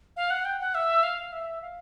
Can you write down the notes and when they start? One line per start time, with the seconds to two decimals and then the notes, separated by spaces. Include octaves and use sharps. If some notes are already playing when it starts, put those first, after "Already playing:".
0.16 F5
0.30 F#5
0.45 G5
0.60 F#5
0.75 E5
1.03 F5
1.32 E5
1.62 F5